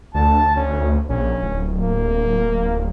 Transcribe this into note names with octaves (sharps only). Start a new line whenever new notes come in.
D2 A5
C#4
A#1 C#4
D1
A#3